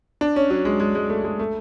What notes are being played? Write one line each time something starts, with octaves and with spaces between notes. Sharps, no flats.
D4
C#4
F#3
G#3
G#3
G#3
A3
G#3
A3